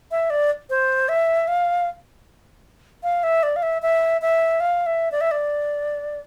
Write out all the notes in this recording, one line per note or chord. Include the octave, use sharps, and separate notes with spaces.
E5
D5
C5
E5
F5
F5
E5
D5
F5
E5
E5
E5
F5
E5
D5
E5
D5